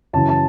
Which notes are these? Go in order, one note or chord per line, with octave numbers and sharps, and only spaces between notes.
F#2 C#3 E3 A5
A5